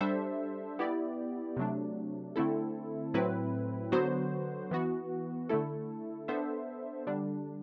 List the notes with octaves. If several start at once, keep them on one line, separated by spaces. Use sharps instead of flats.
G3 D4 A4 C5 E5
B3 E4 G4 D5
C3 F#3 A3 D4
D3 A3 C4 E4 A4
A2 F#3 C4 E4 B4
D3 F#3 B3 F#4 C5
E3 B3 F#4
D3 A3 E4 A4
B3 D4 A4 C5 E5
D3 G3 D4